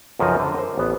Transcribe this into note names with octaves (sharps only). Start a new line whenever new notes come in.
B1 F#2 C#3 F3 D#5
D3 C5
A#4 C5
A1 B3